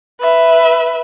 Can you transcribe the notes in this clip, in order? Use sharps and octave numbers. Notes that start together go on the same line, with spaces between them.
B4 E5